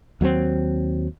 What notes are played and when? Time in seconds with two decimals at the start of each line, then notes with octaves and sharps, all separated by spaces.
0.21 D#2 F#3 A3 C4